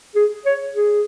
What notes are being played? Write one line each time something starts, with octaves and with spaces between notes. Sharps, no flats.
G#4
C#5
G#4